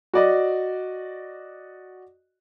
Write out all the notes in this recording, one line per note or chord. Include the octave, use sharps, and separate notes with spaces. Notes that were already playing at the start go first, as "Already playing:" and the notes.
F#4 D5 D#5